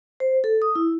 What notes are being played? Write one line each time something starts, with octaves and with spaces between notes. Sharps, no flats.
C5
A4
D#6
E4